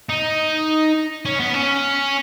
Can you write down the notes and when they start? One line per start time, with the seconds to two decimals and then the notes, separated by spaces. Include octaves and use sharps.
0.09 D#4
1.25 C#4
1.40 B3
1.54 C#4